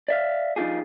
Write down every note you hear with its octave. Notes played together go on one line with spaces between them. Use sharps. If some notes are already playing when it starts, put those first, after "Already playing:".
D5 E5 F5
F3 D4 D#4 F4 G4 G#4